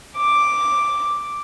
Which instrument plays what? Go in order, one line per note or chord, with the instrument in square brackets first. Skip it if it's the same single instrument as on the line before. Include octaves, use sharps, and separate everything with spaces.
[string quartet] D6